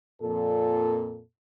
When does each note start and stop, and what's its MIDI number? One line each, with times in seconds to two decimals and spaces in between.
0.22 1.21 41
0.22 1.21 46
0.22 1.21 69